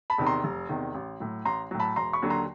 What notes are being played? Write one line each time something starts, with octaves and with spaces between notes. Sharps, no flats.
A5 B5
E2 C3 D#3
A#5 C6
F1
E2 C3 D#3
A1
A2 F#3
A1 A#5 C6
A2 F#3
A5 B5
E1 A#5 C6
B5 C#6
D#2 D3 F#3
A#5 C6